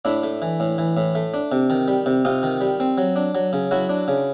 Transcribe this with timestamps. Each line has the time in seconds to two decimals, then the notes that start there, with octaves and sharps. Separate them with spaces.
0.05 A2 D4 E4
0.24 A3
0.42 E3
0.60 A2
0.78 E3
0.97 A2
1.15 A3
1.34 D4
1.52 C3
1.70 D#3
1.88 G3
2.06 C3
2.25 C3 D#4 F4
2.43 D#3
2.61 G3
2.80 C4
2.98 F#3
3.16 D4
3.35 F#3
3.53 C#3
3.71 F#3 E4 F#4
3.89 D4
4.08 C#3